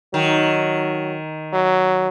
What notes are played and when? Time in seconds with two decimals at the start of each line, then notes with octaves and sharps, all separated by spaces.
0.14 D#3 F#3
1.53 F#3